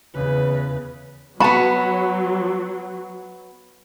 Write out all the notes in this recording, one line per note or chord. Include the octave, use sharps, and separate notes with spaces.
E2 C#3 B4
F#3 B3 F#4 A5 B5